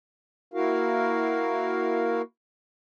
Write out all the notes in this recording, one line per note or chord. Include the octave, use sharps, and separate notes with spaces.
A#3 E4 F#4 A#4 F5